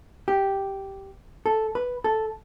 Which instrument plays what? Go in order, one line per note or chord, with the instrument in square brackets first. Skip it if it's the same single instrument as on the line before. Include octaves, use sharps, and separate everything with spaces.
[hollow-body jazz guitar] G4
A4
B4
A4